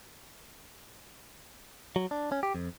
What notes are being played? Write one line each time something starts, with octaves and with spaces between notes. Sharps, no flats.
F#3
D4
C#4
G4
F2